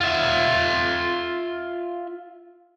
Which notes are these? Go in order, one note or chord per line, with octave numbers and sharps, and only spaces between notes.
F4 E5